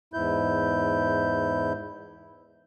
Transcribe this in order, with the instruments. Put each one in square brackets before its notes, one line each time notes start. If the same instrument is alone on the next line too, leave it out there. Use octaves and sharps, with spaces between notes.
[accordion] E2 G#2 E4 G6